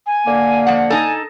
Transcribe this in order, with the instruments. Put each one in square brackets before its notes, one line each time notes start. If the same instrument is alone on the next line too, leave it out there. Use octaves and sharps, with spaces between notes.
[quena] G#5
[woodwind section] D3 A#3
[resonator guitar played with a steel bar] F3 F#5
[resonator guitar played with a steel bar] D#4 A4 [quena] G#5